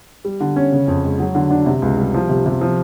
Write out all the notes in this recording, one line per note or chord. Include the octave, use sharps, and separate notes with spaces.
G3
D3
C#4
C#3
F2
G#3
F#3
D3
D4
C3
C#2
G3
F3
C3
C3
F3